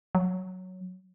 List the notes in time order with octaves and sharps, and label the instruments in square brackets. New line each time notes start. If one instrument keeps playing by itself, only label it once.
[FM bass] F#3